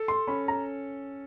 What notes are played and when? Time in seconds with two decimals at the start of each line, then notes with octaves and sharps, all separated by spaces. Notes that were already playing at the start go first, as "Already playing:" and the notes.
Already playing: A4
0.08 C6
0.27 C#4 B5
0.48 A#5